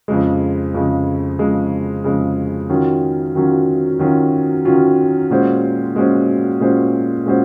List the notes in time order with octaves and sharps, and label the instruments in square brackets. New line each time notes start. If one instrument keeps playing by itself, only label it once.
[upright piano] F2 C#3 G#3
F2 C#3 G#3
F2 C#3 G#3
F2 C#3 G#3
D#3 F#3 C#4 F4
D#3 F#3 C#4 F4
D#3 F#3 C#4 F4
D#3 F#3 C#4 F4
A#2 G#3 C#4 F#4 C5
A#2 G#3 C#4 F#4 C5
A#2 G#3 C#4 F#4 C5
A#2 G#3 C#4 F#4 C5